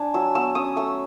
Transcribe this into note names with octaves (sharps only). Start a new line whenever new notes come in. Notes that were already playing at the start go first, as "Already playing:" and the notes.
Already playing: D4 G#5
F#3 E6
B3 E6
C#4 D#6
A3 E6